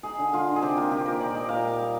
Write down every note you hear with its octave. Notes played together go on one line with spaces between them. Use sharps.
D#4 G#4
D3
D3 F4
D#4
G#4
C3 G4
A#3 F4
D#3 G4
A#3 A#4
A#2 D5
D#4 D#5
A#2 F5
A#2
G3